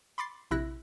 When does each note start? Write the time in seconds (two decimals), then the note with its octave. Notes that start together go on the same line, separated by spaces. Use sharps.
0.18 B5 C6 D6 A6 C7
0.51 A#1 C3 E4 E6 F#6 A#6